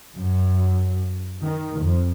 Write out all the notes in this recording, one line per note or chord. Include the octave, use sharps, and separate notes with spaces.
F#2
D#3
F2